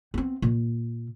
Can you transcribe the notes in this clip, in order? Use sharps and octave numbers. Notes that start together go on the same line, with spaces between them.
B3 C4
A#2